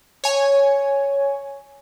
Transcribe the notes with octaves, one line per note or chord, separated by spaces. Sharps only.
C#5 G#5